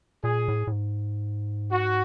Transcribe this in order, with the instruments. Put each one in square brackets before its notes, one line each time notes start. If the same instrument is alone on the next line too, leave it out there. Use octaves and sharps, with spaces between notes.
[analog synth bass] A#2 [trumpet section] G#4
[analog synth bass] A2
A2
G#2
[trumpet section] F#4